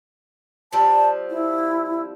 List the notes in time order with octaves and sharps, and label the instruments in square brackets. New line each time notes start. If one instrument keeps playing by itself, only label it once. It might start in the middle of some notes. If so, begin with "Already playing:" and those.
[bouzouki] F3 G3 C4 [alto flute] A5
[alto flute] E4